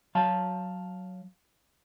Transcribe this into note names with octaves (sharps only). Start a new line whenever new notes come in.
F#3 F5 A5